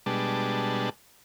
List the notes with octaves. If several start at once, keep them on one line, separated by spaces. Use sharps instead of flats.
B2 G3 G#3 D4 A5